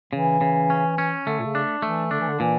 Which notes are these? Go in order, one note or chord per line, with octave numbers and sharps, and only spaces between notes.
C#3 E3
C#3
C#4
C#4
D3 A3
A#2
C#3
D4
E3 A3
D3 D4
E3
D3
A#2 E3